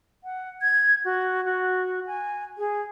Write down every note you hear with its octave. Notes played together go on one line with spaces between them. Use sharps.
F#5
G#6
F#4
F#4
G#5
G#4